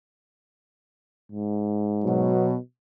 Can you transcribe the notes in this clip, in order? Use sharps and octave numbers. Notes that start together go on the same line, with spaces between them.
G#2
B2 F#3